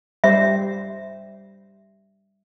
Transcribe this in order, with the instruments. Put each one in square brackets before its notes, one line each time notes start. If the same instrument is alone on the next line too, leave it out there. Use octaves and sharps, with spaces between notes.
[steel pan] G3 C5 [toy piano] E5